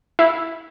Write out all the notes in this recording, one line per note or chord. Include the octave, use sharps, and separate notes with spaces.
E4